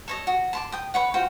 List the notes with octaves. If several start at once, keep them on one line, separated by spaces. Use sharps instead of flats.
A4 C#5 D#5
F#4
A5 C6 D6
G5 D#6
B4 C#5 F#5
F4 F#4 C5 G5